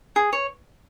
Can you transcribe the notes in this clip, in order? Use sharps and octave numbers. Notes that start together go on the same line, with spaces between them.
G#4
C#5